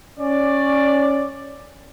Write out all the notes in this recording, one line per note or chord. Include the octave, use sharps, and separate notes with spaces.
C#4 D5